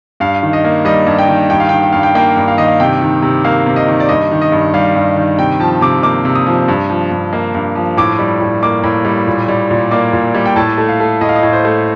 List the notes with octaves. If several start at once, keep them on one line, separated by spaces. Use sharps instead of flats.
G2 F5
D#3
D#5
A#3
G3 D#5
G2
G5
D#3
G2 G5
F5
D#3 G5
G5
G2 F5
G5
A#3 G5
G2
F5
D#3 D#5
F5
C3 G5
D#3
C3
A#3 F5
C3
D#5
D#3
D5
G2 D#5
D#3
D#5
G2
G3 F5
G2
D#3
C3 G5
F3 A5
C3 D6
A#3 D6
C3
D#6
F3
G2
F3
G2
A#3
G2
F3
A2 D6
G3
A2
A#3 D6
A2
G3
A#2
G3
A#2
A#3 D6
A#2
G3
G5
A2 A5
A3
F5
A3
A2 D#5
F5
D#5
A2
C5
A3